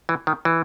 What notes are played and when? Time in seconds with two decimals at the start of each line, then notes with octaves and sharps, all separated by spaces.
0.09 E3
0.27 D#3
0.45 E3